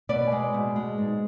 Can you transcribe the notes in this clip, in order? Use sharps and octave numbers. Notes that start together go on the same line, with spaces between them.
B2 B4 D5
G#3
B2
G#3
G#2